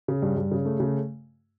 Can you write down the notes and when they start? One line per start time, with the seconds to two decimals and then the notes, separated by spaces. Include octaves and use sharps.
0.08 C#3
0.22 G2
0.37 G2
0.51 C#3
0.65 A3
0.80 C#3